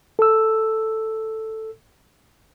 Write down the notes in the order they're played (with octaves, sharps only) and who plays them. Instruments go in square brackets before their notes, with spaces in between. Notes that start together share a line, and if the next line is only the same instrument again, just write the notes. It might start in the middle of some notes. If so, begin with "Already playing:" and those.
[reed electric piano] A4 E6